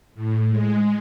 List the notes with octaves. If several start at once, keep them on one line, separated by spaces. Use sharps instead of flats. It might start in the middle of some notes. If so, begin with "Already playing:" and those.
A2
G#3